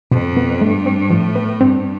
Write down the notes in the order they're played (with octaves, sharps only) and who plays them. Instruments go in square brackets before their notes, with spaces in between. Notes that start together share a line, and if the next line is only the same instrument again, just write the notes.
[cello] F2 [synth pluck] B2
[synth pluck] B3
[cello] G2 [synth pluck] A3
[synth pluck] C4
[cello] A2 [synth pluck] F3
[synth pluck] B3
[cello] G2 [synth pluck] C4